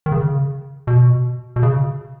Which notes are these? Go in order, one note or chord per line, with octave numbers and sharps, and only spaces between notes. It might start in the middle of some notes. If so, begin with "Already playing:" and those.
D#3
C#3
B2
B2
C#3